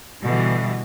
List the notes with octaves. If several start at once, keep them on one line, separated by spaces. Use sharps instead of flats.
B2 D3 E3 G3